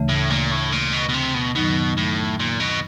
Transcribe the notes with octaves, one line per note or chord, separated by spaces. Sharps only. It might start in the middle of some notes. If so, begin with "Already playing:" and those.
Already playing: D2 C#3 E3 A3
A2
A#2
A2
A#2
B2
B2
C3
B2
F#2 B2 D#3 F#3 B3 D#4
A2
A#2
B2